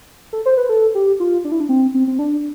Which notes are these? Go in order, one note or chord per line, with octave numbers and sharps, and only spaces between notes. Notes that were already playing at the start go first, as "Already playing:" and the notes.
A4
C5
B4
A4
G4
F4
D4
E4
D4
C4
C4
C4
D4